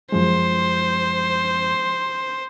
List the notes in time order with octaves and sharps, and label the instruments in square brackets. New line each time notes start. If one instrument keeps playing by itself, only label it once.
[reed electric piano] F#2 F3 G#3 [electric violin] C5